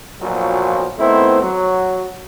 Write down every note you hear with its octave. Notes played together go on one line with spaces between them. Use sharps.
B1 A#2 F3 F#3
D#3 A3 B3 C4 E4 C5
F#3